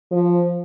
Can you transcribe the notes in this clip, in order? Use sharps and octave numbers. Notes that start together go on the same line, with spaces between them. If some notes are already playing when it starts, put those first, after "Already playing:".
F3